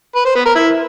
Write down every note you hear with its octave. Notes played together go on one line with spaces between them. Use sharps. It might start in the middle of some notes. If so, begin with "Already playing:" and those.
B4
C5
B3
A#4
E4